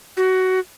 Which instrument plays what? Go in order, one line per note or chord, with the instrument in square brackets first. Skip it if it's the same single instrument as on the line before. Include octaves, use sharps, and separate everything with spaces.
[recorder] F#4